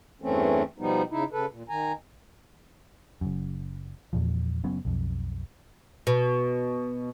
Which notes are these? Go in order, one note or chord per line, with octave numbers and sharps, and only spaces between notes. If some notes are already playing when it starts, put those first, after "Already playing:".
E2 G2 E3 A3 C4 C#4
B2 F3 G3 B3 D#4
C#3 D#4 E4
C#3 A4 B4
A#2
D#3 G#5 A#5
F#1 F#2
E2 A#2 F3
F#1 F#3 B3 C#4
B1 F2
B2